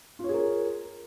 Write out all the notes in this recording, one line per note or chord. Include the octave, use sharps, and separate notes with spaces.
F4 G#4 A#4 C#5